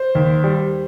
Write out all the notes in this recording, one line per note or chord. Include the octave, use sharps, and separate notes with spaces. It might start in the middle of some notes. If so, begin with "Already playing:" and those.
Already playing: C5
D#2
G3